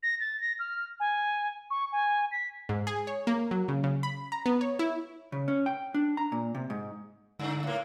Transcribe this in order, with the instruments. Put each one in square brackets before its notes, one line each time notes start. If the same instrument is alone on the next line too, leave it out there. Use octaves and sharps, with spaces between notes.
[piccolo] A#6
A6
A#6
F6
G#5
C#6
G#5
B6
[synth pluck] G#2
G#4
C#5
A#3
F#3
C#3
C#3
B5
A#5
B3
C#5
E4
[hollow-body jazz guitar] C#3
C#4
G5
D4
A#5
A#2
C3
G#2
[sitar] G2 [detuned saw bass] D3
[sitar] A2 A#3